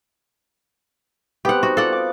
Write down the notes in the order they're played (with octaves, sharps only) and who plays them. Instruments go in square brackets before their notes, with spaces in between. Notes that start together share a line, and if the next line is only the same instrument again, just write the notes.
[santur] B3 C4 [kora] G4 F#5
[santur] D#4 [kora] F#4
[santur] F4 D5 [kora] A4 F#5
[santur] D6